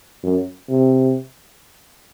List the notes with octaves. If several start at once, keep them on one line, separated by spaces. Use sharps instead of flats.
F#2
C3